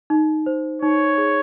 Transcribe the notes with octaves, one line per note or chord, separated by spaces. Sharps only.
D#4
C5
D#4 C#5
G#4